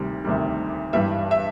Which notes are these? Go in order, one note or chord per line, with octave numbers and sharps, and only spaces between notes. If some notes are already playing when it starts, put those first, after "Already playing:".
Already playing: D2 C3 D#3 G3
D2 C3 D#3 G3
G2 E3 G3 E5
E5